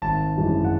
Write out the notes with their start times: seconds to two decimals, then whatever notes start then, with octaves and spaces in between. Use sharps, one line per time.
0.02 G#1 A5
0.37 F#2 E3 G#3
0.64 F#5